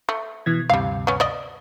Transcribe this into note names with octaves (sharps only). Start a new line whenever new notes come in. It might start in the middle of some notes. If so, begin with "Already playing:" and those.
A3
B2 E3 G#6
D2 G2 C3 G3 F5
B3 C#4
D5 D#5